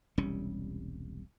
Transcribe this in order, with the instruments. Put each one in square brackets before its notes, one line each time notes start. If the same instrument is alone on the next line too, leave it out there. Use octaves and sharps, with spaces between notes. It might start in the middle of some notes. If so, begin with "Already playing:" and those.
[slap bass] E1 C2 G3 C#4